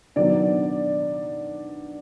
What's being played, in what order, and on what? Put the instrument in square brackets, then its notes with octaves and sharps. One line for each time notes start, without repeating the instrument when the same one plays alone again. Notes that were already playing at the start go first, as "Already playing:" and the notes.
[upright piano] D#3 F#3 B3 D4 D5